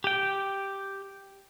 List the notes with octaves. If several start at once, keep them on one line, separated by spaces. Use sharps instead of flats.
G4 G5